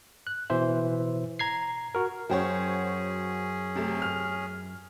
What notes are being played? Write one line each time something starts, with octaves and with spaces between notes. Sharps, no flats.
F#6
B2 E3 C5 E5
A#5 G#6 C7
F#4 A#4
F#2 C#4 F#4 G#4 C5 C#5 G5
C3 A3
F6